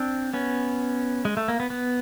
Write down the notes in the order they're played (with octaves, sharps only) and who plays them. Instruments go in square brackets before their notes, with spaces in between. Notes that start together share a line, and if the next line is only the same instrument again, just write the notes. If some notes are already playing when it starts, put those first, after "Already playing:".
Already playing: [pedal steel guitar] C4 D4
B3 C#4
G#3
A3
A#3
B3
B3